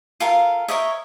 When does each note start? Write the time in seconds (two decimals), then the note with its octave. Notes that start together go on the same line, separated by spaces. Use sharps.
0.20 F4 A4 A#4 F5
0.68 A#4 C#5 D#5 E5